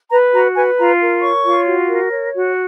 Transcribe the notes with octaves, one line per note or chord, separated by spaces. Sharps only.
B4 A#5
F#4 A#5
B4 G#5
F4 A#5
A#4
C#5 C#6
F4
F#4
A#4
C#5
F#4